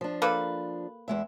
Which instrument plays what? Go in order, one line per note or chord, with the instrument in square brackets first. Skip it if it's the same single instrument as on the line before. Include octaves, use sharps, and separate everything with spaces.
[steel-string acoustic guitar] F3 D4
[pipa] A#3 A4 B4
[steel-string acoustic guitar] E2 G#3 E5